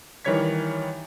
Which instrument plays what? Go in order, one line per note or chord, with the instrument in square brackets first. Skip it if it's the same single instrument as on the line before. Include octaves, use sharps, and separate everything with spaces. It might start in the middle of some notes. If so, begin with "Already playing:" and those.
[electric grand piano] D#3 E3 G3 C#5 G#6 B6